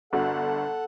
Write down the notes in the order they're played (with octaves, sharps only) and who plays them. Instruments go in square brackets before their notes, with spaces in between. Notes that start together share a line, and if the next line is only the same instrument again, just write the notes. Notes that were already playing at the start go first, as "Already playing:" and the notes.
[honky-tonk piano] G1 D3 F#4 [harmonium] A4 F#5